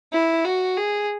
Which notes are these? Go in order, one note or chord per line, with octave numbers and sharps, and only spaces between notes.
E4
F#4
G#4